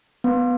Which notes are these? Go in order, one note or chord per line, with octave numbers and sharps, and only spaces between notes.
B3